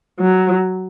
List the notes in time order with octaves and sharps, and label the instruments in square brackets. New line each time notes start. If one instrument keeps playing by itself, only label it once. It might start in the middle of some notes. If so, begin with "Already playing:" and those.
[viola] F#3